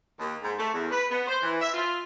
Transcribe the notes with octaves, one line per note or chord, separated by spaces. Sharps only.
D#2
G#2
A3
E2
B4
B3
C5
E3
E5
F4